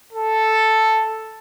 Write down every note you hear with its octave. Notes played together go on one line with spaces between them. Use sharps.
A4